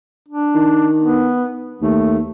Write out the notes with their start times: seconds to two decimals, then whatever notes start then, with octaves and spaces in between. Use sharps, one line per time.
0.28 D4
0.55 D#3
0.98 B3
1.82 D#2 A3